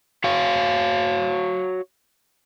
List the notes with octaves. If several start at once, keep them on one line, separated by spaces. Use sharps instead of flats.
F#4 C#5 F5